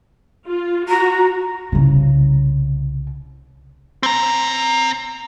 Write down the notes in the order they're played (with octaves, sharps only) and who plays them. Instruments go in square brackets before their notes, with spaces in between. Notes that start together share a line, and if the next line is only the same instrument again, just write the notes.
[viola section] F4
[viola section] F#4 [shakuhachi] A#5
[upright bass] C2 C#3
[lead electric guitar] C4 A#5